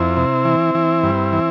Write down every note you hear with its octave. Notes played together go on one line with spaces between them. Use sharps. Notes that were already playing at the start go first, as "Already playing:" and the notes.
Already playing: F2 C4 E4
C3
E3
E3
G2
E3